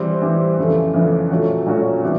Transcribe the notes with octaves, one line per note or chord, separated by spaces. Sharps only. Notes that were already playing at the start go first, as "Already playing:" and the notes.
Already playing: E3 G3 C4
E3 G3 C4
F2 C#3 E3 A3
F2 C#3 E3 A3
A#2 F#3 A3 C#4 F#4
A#2 F#3 A3 C#4 F#4
C3 E3 G3 B3